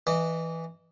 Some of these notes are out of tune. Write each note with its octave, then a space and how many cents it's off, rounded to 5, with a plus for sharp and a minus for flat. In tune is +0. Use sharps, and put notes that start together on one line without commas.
E3 +0 D#5 -30